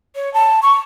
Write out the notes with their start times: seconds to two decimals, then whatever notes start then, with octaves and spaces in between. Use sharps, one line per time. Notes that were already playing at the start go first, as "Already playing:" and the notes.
0.16 C#5
0.34 A5
0.62 C#6